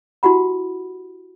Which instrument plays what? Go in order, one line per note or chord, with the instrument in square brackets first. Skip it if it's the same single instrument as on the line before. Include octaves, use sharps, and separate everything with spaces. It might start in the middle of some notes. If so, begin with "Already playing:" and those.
[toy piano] E4 F#4 G4 F#5 B5